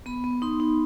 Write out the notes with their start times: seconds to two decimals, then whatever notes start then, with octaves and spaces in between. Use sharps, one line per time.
0.06 B3 B5
0.24 B3
0.42 D#4 C6
0.60 D#4